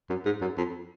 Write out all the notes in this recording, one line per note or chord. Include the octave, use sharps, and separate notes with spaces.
F#2
G#2
F#2
F2